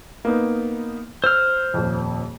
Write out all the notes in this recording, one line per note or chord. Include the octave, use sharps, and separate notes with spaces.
A#3 B3 D#4
C5 E6 F6
D#1 F2